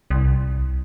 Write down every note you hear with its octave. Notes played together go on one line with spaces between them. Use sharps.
C2